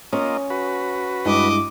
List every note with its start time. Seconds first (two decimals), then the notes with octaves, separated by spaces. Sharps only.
0.13 A#3 C#4 F4 D#5
0.50 F#4 B4
1.26 G2 G#3 E4 D#5 D6